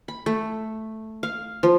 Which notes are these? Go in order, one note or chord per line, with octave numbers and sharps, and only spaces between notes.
B5
A3
F5
F3